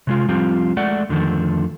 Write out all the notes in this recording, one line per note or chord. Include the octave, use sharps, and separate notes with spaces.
C3 G#3 F4
F3 G3 C4 F4 G4
G#3 A3 D5 F#5
F2 D3 D#3 F3 A3